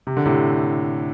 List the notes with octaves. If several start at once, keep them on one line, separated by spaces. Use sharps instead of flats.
C3
D3
A2 C3